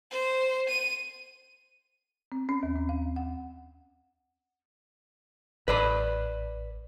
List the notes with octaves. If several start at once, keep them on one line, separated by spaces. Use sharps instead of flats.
C5
D#7
C4
C#4
D#2
C4
F5
F#5
A1 B4 D5 B5